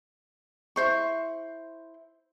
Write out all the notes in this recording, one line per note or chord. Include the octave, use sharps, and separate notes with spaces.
E4 F#4 C5 C#6